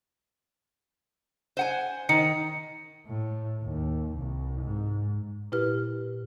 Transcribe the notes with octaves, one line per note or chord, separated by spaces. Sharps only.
C5 F#5 G#5
D#3 C#7
A2
D#2
C2
G#2
A#2 E4 G4 B4 F6